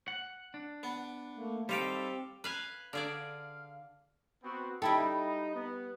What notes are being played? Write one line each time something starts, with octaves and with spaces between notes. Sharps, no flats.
F#5
D4
B3
A3 A#3
G3 C4 D#4 G4 A4 C5 F5 G5
B4 F5 G#5
D3 G#4 D5 F5
B3 C4 F#4
G3 D#4 E4 A4 G5
B3